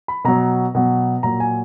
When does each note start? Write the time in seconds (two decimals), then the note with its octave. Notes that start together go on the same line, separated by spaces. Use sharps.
0.08 B5
0.24 B2 F#3 A#5
0.75 B2 F#3
1.23 A#2 F#3 A#5
1.40 G#5